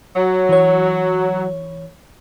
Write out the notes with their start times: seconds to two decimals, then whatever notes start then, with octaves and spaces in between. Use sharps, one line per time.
0.15 F#3
0.49 E3 C#5